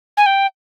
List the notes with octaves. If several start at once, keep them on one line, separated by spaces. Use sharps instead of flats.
G#5
G5